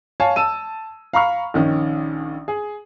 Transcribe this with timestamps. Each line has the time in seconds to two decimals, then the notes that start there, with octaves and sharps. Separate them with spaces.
0.20 C#5 F5 G#5 A5
0.36 A5 E6 D#7
1.13 F5 A#5 B5 C#6 F6
1.54 A#1 D#3 C#4
2.48 G#4